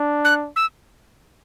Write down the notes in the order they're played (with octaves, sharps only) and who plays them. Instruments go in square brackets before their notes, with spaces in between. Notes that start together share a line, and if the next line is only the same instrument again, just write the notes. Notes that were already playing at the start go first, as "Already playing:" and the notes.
Already playing: [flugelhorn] D4
[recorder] F#6
E6